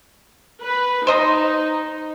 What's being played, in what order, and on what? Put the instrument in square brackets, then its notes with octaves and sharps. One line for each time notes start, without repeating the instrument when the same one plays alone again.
[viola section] B4
[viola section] D#4 [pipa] C5 D#5 A#5